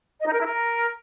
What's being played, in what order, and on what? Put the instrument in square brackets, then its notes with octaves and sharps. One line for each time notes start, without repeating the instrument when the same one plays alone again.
[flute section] D#5
D#4
A#4
E4
A#4